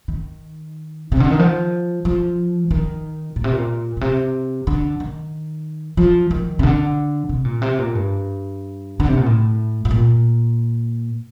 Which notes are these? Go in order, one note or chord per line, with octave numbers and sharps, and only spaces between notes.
D#3
C3
D3
D#3
F3
F3
D#3
A#2
C3
A#2
A#2
C3
D3
D#3
F3
D#3
C3
D3
C3
A#2
C3
A#2
G2
D3
C3
A#2
A2
A2
A#2